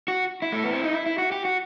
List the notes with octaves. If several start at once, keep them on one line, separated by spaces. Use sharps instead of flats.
F#4
E4
A3
B3
C4
D#4
E4
E4
F#4
G4
F#4